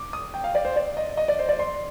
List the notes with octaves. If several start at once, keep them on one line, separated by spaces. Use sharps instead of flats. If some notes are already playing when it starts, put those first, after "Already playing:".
Already playing: D6
D#6
G5
F5
D5
C5
D5
D#5
D#5
D5
C5
D5
C6